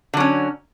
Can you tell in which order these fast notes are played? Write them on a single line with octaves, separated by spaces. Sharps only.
D3 F#3 C#4